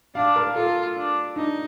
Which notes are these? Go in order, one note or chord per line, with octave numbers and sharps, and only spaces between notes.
D4 F5
A#4
F4 A4
D4
D4 D#4